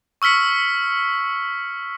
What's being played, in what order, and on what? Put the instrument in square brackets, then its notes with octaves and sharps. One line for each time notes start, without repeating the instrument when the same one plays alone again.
[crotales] C#6 E6 F6 B6 C#7